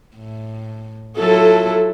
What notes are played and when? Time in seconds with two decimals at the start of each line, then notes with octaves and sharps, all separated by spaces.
0.17 A2
1.18 F#3 E4 F4 A4